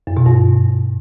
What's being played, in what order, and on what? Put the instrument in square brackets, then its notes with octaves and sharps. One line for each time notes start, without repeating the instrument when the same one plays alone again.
[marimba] F#2
B2
G2